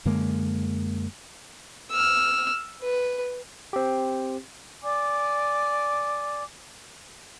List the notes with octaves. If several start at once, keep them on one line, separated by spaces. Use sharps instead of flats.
F#2 D3 G#3 A#3
E6 F6
B4
C4 G4
D5 G#5 D6